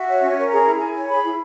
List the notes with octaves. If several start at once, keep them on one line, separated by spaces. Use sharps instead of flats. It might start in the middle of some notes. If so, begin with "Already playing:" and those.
Already playing: F#4 E5
C#5
C#4
A#4
G#4 A#5
E4
E4 G#5
C#5
G#4 B5
E4